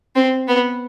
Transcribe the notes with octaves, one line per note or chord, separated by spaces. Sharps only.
C4
B3